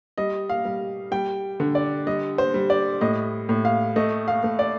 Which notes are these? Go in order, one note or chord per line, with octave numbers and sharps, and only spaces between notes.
G3 D#5
F5
G3
G3 G5
D3
D5
G3 D#5
C5
G3
D5
A2 D#5
A2
F5
A3 D#5
F5
A3
D5